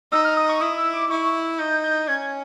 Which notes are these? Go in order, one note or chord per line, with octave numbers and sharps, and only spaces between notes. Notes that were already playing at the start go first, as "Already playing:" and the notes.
D#4 E6
F6
D#6
C#6
E4 D#6
E6
D6
E4 C#6
D#4 G6
G6
C#4 G#6